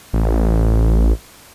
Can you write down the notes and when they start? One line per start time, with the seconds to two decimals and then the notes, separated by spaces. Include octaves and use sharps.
0.14 A1